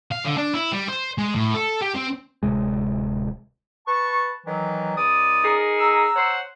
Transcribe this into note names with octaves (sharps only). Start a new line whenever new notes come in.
F5
D3
D4
E4
G3
C5
G#3
A2
A4
G4
C4
D1 C3 G#3
B4 A5 C#6
D#3 E3 F#3
C#2 D5 D#6
D#4 G#4 A#4
A#5 E6
C5 C#5 F#5